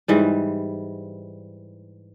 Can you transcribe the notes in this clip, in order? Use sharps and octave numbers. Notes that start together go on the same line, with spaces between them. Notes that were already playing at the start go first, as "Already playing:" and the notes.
G#2 E3 G3